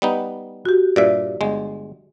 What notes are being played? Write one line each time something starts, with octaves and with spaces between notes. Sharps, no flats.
G3 B3 D#4
F#4 G4
G2 A#2 D5 E5
G1 G#3